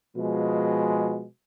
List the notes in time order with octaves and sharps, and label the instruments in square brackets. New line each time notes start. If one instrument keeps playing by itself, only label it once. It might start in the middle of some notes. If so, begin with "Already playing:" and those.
[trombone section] B2 F3 G#3